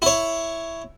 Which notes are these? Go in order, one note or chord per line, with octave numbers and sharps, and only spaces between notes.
E4 C#5